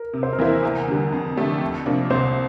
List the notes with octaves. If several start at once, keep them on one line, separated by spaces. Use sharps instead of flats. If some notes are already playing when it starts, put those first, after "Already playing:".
Already playing: A#4
C3
C5
A#4
E3 A#3 E4 C5
E2 A#4
D3 G3
F2
D3 A3 D4 G4
F2
C3 F3 A#3 D4
C2 C5